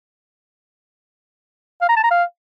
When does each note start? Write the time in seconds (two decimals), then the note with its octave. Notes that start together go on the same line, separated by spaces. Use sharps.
1.82 F5
1.89 A#5
1.96 A5
2.04 A#5
2.11 F5